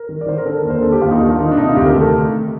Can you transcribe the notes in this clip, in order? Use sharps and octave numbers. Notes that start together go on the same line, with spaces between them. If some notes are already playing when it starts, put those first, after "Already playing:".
Already playing: A#4
D#3
D5
D#3 C5
A#4
D3 A4
A#4
D#2
C5
D3 A4
G4
D#2 F4
D#4
D#3 D4
F4
D#3 D#4
D4
C3 D#4
F4
D2 G4
A#4
D#3 A4